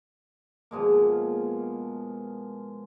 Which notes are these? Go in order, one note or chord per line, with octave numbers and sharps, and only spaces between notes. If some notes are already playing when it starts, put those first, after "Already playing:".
B2 F3 G#3 A#3